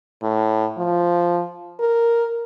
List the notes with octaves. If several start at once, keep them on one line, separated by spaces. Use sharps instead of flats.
A2
F3
A#4